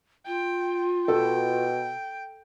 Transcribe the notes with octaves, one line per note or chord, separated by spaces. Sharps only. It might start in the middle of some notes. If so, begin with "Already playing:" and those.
F4 G5
B2 A4 G5